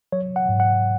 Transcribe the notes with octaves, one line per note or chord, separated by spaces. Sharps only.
F#3 C#5
F#5
G#2
F#5